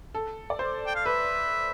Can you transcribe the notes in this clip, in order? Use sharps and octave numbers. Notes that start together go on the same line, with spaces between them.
A4
D5
C5
G5
F5
B4 E5